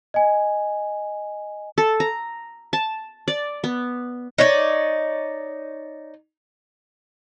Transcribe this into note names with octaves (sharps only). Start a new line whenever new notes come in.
D#5 G#5
A4
A#5
A5
D5
B3
D#4 C#5 D5